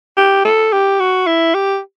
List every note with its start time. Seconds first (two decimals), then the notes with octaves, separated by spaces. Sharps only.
0.17 G4
0.45 A4
0.73 G4
1.00 F#4
1.27 E4
1.54 G4